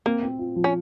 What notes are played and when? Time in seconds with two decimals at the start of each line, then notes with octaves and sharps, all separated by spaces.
0.06 A#3 C4
0.23 C4
0.39 F4
0.56 F3
0.64 C#4